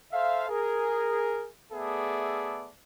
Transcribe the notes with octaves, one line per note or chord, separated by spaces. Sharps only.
A4 C5 E5 F5
G#4 A#4
A3 B3 G#4 A4 D5 E5